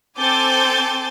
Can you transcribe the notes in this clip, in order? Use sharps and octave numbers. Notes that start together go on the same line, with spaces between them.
C4 A4 G#5 D6 G6 A6